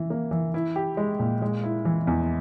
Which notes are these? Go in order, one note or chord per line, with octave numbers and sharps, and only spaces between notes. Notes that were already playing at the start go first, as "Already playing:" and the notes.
Already playing: E3
A#3
E3
E4
G4
G#3
A#2
G#3
E4
E3
E2